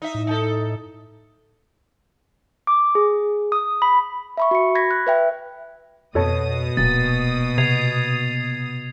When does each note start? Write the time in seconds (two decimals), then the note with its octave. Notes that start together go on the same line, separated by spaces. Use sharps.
0.02 D#4 E5
0.15 A2
0.27 D#4 A4
2.67 D6
2.95 G#4
3.52 D#6
3.82 B5
4.37 E5 B5 C#6
4.51 F#4 C#7
4.75 B5 G#6 A#6 B6
4.91 F#6
5.07 B4 E5 G5
6.15 F2 B2 A4 C#5 A5 D#6
6.77 D1 A#2 A6
7.58 C3 G#6 C7 F7